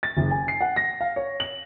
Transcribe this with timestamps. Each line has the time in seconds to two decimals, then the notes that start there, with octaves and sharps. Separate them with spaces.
0.03 A6
0.17 F#1
0.31 G#5
0.48 C7
0.61 F#5
0.76 A#6
1.01 F5
1.16 C#5
1.40 F#7